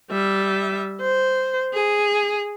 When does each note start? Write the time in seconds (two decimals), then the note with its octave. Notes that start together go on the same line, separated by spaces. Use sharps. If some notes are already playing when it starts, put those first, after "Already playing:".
0.10 G3 E5
1.01 C5
1.74 G#4